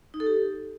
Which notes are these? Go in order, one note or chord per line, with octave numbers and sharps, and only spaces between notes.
D#4
A4
G4